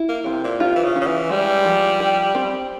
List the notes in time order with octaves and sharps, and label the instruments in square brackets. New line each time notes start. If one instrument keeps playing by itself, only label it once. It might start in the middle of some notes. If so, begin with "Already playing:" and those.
Already playing: [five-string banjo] E4
[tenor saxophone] A#3
[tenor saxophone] C3 [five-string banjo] C4
[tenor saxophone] A#2
[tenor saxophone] C3 [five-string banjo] F4
[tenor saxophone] E3
C#3
[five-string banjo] C#4
[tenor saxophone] C#3
E3
[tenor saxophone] G3 [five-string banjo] G#3
[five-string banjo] F3
G4
C4